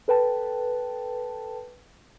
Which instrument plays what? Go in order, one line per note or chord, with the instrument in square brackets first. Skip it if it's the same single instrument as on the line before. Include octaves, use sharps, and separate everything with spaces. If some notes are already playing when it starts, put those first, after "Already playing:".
[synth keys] A4 B4 G5 A5